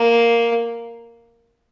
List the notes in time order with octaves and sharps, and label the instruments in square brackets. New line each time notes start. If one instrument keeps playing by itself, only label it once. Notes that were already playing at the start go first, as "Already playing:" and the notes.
Already playing: [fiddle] A#3